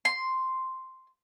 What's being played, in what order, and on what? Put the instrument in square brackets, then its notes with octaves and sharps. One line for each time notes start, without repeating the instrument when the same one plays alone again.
[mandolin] C6